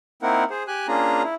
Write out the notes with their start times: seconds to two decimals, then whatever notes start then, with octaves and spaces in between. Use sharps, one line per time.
0.23 A#3 C4 D#4 E4 A#4 F#5
0.50 G#4 C5
0.68 G4 G#5 F#6
0.88 A#3 C#4 D4 F4 G#4 A#5
1.23 E4